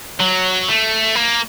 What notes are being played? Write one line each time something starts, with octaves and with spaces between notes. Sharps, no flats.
F#3
A3
A#3